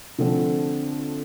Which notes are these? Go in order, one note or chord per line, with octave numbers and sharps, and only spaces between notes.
D3 F3 A3 C4